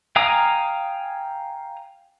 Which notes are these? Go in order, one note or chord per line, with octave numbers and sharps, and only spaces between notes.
F5 G5 G#5 A#5 D#6